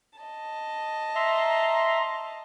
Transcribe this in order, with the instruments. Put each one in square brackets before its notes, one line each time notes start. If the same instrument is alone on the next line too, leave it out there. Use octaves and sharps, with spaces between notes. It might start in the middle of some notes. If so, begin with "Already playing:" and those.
[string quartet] D#5 A5
[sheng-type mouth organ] E5 [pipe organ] A#5 C6